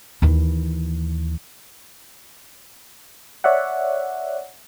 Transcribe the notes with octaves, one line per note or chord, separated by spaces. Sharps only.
D#2 E3
C#5 D5 E5 F#5